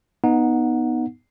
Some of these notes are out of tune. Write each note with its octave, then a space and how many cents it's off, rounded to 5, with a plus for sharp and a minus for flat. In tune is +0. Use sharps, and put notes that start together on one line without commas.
B3 +0 D#4 +0 F#5 -20